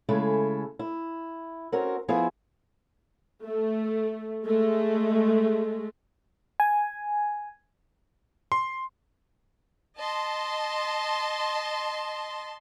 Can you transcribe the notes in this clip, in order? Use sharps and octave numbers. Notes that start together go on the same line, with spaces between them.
C#3 G#3 A3 E4 A4
E4
C4 C#4 F#4 A#4
F3 B3 E4 G#4 C5
A3
G#3 A3
G#5
C6
D#5 A5 C6